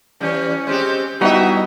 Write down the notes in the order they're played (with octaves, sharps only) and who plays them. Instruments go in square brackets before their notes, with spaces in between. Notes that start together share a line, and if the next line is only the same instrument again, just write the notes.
[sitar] E3 G3 [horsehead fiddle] C#4
[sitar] G#3 C4 G4
[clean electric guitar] G3 B3 D#4 [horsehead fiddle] E4 D#5 [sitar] F#4 E5